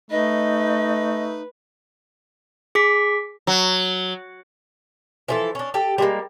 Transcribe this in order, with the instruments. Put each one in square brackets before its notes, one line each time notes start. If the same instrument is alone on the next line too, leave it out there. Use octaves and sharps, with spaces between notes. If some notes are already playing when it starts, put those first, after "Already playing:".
[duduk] A3 [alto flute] D#4 [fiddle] B4 [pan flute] D#5
[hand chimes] G#4 D6 B6
[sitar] F#3
[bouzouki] E3 F3 A4
C#4 D4
G4 A4
G3 G#3 A#3